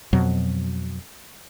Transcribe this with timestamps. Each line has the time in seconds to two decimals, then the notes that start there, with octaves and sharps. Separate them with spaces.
0.13 F2 B2 F#3